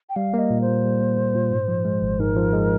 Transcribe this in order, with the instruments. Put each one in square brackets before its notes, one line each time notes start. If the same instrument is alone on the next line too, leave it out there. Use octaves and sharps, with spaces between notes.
[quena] G5
[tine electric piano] G3 [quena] F5
[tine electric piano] A#3
[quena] D#5
[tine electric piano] A#2
[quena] C5
[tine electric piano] A#2
G3
A#3
A#2
A#2
G#2
F3
G#3
G#1
[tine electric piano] G#2 [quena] A#4
[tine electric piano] F3
G#3